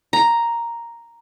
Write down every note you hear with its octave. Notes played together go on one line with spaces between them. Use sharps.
A#5